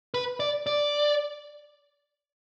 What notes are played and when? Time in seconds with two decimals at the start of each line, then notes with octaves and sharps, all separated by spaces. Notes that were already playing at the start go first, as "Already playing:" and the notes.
0.14 B4
0.40 D5
0.67 D5